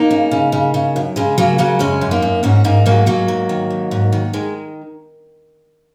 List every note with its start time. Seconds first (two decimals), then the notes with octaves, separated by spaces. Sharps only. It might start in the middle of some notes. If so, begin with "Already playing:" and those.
Already playing: A#3 D#4
0.11 C#3
0.31 C#3
0.52 C#3
0.74 C#3
0.96 F#2
1.16 C#3 G#3
1.38 C#3 F#3 A#3
1.58 C#3 F#3 A#3
1.79 F#2 G#3 C#4
2.01 F#2
2.11 A#3 D#4
2.22 F#2
2.43 G#2 C#4 F#4
2.64 G#2 A#3 D#4
2.86 G#2 F#3 A#3
3.06 G#2 F#3 A#3
3.28 G#2
3.49 D#3
3.70 G#2
3.91 G#2
4.12 D#3
4.33 D#3 G#3